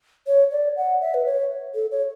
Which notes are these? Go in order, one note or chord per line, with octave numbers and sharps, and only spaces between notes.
C#5
D5
F#5
E5
B4
C#5
A4
C#5